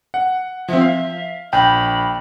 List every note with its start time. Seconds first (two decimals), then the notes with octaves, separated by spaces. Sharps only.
0.14 F#5
0.68 F3 C4 E5
0.81 F5
1.53 A#1 G5 B5